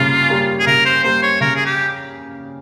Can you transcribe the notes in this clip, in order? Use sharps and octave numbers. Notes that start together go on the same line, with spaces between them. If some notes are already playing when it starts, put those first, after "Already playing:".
Already playing: C#3 G3 A#3 F4
G3 A#3
G#4
C#3 A#4
C5
G3 A#3 C5
C#5
C#3 A#4
G#4
G4